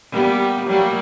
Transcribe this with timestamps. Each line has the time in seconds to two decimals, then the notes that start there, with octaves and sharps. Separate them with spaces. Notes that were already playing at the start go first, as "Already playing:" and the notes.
0.11 G3 A#3 B3
0.67 F#3 G3 A#3